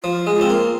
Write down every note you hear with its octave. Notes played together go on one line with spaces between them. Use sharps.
F3 F4
G#3
F4
C4
A#3